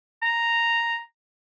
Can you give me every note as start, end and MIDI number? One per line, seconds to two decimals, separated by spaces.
0.23 0.99 82